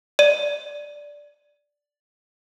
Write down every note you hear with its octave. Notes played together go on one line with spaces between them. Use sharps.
D5 D#7